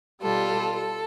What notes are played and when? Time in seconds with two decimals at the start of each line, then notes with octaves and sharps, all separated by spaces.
0.21 B2 G3 F4 A4
0.77 A4